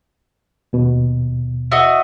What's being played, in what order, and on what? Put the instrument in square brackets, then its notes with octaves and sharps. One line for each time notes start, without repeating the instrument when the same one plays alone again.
[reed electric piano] D#2 B2
[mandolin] E4 F#4 D#5